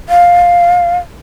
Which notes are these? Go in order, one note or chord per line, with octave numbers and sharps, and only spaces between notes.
F5